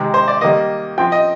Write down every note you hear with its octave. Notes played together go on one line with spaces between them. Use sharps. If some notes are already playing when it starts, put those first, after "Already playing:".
Already playing: C3 D#3 G#3
C5
D5
D#3 G3 A#3 D#5
F3 C4 G5
D#5